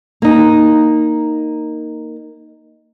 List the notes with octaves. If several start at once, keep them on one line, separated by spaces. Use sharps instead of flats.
A#3 D#4